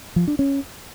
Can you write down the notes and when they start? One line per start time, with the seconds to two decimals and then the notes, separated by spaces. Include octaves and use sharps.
0.16 F3
0.28 D4
0.39 C#4